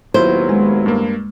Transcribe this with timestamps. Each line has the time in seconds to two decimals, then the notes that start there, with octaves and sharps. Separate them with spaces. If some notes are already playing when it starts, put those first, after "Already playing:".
0.14 D#2 A2 F#3 B3 E4 F4 C5
0.49 G#3
0.86 G2 A#3